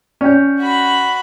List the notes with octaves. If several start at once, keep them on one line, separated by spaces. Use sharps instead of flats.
C#4 D5 G5 G6
F#4 B5